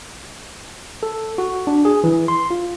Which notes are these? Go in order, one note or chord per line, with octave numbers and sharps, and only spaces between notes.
A4
F#4
D4
G#4
E3
C6
F4